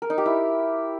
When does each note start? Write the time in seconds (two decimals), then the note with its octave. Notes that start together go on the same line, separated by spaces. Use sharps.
0.02 A#4
0.10 D#4
0.18 G4
0.26 E4